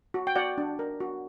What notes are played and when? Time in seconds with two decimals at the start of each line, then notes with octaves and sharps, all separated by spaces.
0.14 F#4
0.27 G5
0.36 F#4 D5 F#5
0.58 D4
0.79 A#4
1.00 F#4